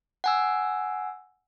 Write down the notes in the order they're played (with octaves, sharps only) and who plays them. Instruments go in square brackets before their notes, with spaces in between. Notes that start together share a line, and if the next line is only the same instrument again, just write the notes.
[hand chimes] F#5 G#5 E6